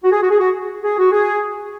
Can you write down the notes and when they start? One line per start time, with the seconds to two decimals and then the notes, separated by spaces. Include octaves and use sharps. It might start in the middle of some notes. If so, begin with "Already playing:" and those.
0.03 F#4
0.12 G#4
0.21 F#4
0.30 G#4
0.39 F#4
0.84 G#4
0.98 F#4
1.12 G#4